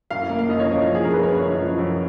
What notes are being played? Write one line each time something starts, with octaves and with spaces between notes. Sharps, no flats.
F#2 F5
A#3
F5
F#2 D#5
C#5
F3 D#5
F3
G#4
F#2 A#4
B4
F#2 C#5
F#2
F3
F#2